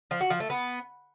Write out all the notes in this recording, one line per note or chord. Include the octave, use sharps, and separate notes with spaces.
F3
F#4
F3
A3
B3